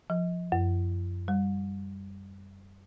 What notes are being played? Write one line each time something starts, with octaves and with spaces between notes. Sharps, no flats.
F3
F#2
G3